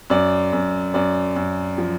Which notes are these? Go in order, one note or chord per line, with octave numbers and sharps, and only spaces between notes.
F#2 D5
F#2
F#2 D5
F#2
F3